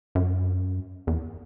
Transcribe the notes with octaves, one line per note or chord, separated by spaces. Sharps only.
F#2
E2